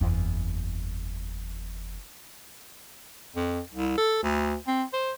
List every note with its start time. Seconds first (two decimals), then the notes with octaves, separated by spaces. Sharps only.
0.01 F#1 E2
3.36 F2
3.73 C2
3.98 A4
4.23 D2
4.67 C4
4.93 C5